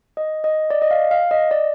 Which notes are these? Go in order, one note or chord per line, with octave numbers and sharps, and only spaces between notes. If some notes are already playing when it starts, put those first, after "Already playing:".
D#5
D#5
D5
D#5
F5
F5
D#5
D5